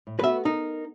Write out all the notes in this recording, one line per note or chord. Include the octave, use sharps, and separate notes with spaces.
A2
A3 B3 F#4 B4 E5
D#4 A#4